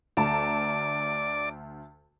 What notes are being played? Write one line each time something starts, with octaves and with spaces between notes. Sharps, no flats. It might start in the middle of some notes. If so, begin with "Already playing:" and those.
D2 D5 A5 A#5